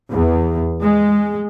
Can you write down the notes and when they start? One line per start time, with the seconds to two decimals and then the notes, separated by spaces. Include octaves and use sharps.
0.11 E2
0.81 G#3